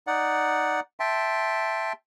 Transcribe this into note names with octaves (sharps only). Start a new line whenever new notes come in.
D#4 D5 F#5
E5 G5 A5 C6